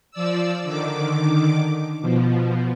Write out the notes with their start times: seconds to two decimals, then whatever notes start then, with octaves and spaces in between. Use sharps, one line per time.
0.11 F3 D5 E6
0.63 D3 D#3 D6
2.02 B2 F3